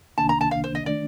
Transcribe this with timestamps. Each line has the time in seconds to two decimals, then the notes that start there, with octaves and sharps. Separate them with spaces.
0.18 C2 C3 D#3 A#3 D4 A5
0.29 A#5
0.41 A5
0.51 F5
0.64 C5
0.75 D#5
0.86 D#3 A3 D4 D5